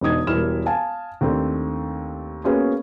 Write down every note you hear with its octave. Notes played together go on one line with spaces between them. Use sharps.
E1 D3 D#4 D#6 G#6
E1 G3 E4 A#4 F6 E7
F5 G#5 A5
D#2 A3 C4 D4
A#3 B3 C#4 F#4 G#4